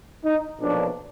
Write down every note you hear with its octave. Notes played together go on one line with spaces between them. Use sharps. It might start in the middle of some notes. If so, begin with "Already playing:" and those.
D#4
B1 A#2 F3 D4